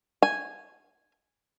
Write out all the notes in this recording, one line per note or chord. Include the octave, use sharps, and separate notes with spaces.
G#5